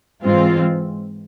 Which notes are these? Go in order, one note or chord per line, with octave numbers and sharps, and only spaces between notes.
G#2 E3 G#3 C4 F4